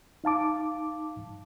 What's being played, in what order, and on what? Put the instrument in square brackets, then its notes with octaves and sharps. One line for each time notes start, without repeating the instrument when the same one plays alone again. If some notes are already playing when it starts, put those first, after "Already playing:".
[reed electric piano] D#4 F5 A5 D6